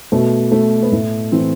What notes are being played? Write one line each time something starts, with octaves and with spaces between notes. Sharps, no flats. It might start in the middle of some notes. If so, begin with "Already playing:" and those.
B2 A3
A3
B3
A2 A3
E3 C4